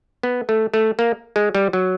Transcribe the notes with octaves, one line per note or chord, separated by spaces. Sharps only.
B3
A3
A3
A#3
G#3
G3
F#3